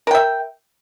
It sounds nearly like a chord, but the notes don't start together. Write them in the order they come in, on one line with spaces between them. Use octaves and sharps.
A#4 G5 E5